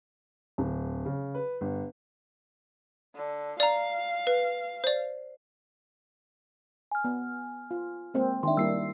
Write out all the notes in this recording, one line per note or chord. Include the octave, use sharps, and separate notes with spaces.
D1
C#3
B4
G1
D3
D5 F5 A#5
B4
C5 D5
G#5 F6
B3
F4
G#3 A#3 C4
D#3 D4 E5 G5 C6
G3 A#3 E4 E6 C7